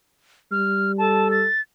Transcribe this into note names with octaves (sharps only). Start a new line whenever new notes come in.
G3 F6
A4 A5
A6